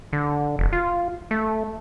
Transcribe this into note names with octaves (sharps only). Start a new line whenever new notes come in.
D3
F1
F4
A3